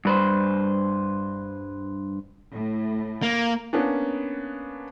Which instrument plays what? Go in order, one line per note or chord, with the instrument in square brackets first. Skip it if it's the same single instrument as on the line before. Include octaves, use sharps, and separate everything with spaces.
[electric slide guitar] G2 B4 C5
[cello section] A2
[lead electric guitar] A#3
[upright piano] A#3 B3 C#4 D4